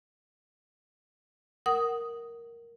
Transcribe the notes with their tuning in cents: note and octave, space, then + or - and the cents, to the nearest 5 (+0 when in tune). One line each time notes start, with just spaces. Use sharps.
A#4 +0 F#5 +20 D#6 +0